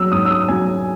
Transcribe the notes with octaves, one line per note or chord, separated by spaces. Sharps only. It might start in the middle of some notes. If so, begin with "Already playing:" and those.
Already playing: F#3 E6
G#2 D#6
E6
D#6
F#3 G#5